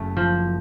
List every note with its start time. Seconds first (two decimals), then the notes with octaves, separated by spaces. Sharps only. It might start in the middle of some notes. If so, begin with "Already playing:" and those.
Already playing: F#1 F#2 A3
0.17 F3